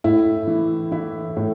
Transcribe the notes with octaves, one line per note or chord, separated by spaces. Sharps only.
A2 E4
E3
E3 E4
A2